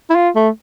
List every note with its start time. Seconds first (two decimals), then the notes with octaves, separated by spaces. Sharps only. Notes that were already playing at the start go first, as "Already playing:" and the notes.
0.10 E4
0.16 F4
0.36 A3